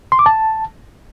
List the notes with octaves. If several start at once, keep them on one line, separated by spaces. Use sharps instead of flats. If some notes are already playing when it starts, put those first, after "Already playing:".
C6
D6
A5